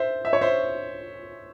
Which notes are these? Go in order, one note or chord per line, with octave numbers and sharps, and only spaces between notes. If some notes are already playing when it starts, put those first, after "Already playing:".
Already playing: C5 E5
E5
C#5
C5 E5